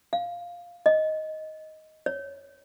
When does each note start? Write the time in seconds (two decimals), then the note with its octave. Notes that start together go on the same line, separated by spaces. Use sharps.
0.13 F5
0.86 D#5
2.06 C#5